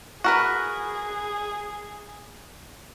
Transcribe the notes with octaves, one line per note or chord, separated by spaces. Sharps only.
F#4 G#4 A#4 B4